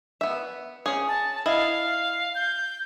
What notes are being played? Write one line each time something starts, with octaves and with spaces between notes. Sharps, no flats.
B3 E5
C#4 G#4
A5
E4 D#5 F5
G6